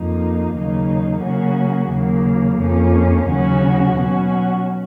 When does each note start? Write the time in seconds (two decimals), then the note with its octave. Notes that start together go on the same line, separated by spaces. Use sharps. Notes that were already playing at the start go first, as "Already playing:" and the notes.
Already playing: F2 F3 A#3 D#4
0.53 D#2 C#3 F#3 A#3 D#4
1.22 C#3 F#3 A#3 C#4 F#4
1.90 D#2 C#3 F#3 A#3
2.59 F2 F3 A#3 C#4
3.27 D#2 C#3 F#3 C#4 F#4
3.96 B2 F#3 C#4 F#4